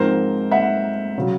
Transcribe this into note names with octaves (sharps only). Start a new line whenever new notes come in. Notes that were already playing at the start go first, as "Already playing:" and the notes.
Already playing: G#2 F3 G#3 C4 A#4 C5
E5 F#5
C#3 F#3